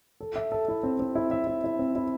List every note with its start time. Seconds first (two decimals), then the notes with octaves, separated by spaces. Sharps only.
0.20 A4
0.36 E5
0.52 A4
0.68 E4
0.83 C4
1.00 C4
1.15 E4
1.31 E5
1.47 E4
1.64 E4
1.79 C4
1.96 E4